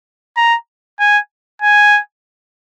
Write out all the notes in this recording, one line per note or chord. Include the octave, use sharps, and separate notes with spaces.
A#5
G#5
G#5